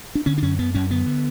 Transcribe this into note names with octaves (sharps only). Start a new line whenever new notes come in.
D4
D3 C#4
D4
F#2 C#4
F#2 B3
F#2 C#4
D3 B3
D3